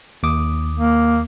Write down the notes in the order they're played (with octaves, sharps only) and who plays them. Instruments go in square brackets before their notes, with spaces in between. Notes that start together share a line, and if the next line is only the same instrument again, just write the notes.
[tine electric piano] D#2 D6 D#6
[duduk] A#3